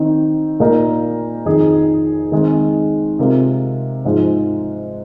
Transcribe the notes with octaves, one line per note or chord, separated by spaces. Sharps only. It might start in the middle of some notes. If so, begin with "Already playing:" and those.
Already playing: D#3 C4 D#4
A#2 A#3 D#4 A#4
F2 D#3 C4 D#4 G#4
D#3 G#3 C4
C3 G#3 F4 A#4
G#2 F3 G#3 F4